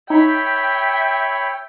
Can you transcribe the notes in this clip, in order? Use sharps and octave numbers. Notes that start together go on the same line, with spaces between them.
D#4 C#5 E5 G5 B5